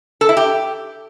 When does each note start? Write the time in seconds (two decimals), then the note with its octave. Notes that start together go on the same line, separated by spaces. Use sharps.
0.21 A4
0.29 E4
0.37 G4